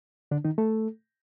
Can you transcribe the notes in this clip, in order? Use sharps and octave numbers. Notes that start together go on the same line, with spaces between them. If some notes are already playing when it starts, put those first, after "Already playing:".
D3 D4
D#3 D#4
A3 A4